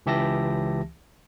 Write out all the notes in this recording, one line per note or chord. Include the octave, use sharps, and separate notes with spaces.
C#2 E3 G4 E5 A5 A#6